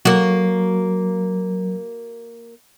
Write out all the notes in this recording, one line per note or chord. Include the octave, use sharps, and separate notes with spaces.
F#3 A#3 F#4